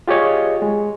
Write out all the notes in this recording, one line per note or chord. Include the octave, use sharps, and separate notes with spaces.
F4 G4 G#4 C#5 D#5
G#3